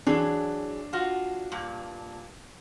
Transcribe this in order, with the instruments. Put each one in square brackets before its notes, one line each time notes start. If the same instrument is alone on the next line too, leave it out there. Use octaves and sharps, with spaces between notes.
[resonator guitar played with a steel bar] E3 F#3 G#4 [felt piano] D4
[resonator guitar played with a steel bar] F4 F#4
G2 A#2